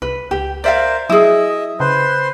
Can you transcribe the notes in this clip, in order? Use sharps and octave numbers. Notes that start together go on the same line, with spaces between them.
C2 B4
C#2 G4
A#4 C5 D5 E5 F5
F#3 E4 G#4 D#5 E5
C#3 B4 C5 C6